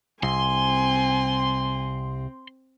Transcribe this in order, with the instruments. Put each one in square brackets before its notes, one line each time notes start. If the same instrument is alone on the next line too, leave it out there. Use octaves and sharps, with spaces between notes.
[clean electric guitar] C2 [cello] C4 [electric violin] G#5 [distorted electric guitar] C6